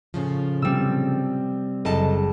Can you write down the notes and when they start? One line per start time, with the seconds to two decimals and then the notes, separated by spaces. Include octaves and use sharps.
0.14 A2 C#3 F3
0.62 C3 G3 C4 E6
1.85 F#1 A4 D#5 A5